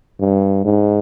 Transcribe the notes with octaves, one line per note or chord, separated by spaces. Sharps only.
G2
G#2